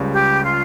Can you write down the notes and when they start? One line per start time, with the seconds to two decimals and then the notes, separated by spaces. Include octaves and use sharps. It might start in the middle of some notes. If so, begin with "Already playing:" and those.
Already playing: C#2 C#3 G3
0.13 G4
0.44 F4